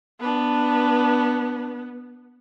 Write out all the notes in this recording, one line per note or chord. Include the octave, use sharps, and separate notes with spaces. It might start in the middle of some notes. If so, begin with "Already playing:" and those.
B3 D4 B4